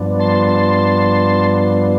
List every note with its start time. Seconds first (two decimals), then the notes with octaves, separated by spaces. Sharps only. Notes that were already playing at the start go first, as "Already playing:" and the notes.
Already playing: G2 F3 B3 D4
0.19 A5 C6
0.47 A5 C6